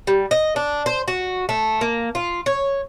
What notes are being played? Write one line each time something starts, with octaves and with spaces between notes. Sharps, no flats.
G3
D#5
D4
C5
F#4
A3
A#3
F4
C#5